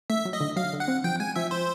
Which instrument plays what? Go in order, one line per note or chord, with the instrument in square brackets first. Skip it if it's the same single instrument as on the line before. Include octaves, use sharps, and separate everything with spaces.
[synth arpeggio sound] A3 [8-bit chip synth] E5
[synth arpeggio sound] F#3
[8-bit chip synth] D#5
[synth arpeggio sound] D3
[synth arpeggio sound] F#3 [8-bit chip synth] F5
[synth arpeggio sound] D3
[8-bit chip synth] F#5
[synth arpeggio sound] C4
[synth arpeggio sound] F3 [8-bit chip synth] G5
[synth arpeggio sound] G#3 [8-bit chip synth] G#5
[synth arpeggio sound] F3 [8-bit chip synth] E5
[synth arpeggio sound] F3 [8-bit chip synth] C5